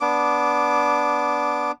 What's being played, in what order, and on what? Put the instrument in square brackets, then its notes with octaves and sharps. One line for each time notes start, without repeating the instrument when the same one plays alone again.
[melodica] B3 D4 D6